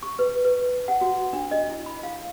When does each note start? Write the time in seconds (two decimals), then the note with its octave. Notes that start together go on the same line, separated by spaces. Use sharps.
0.03 C#6
0.19 B4
0.45 B4
0.88 F#5
1.01 F#4
1.33 D4
1.51 D#5
1.70 E4
1.86 B5
2.03 F5